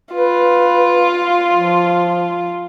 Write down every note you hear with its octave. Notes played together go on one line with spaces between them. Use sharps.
F4 B4
F3